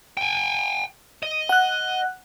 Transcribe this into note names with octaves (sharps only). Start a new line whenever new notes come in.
G5 G#5
D#5
F#5 F#6